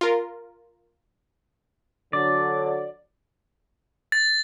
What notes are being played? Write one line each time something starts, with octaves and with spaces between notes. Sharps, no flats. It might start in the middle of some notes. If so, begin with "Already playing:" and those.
F4 A#4
D3 F#3 D5
A6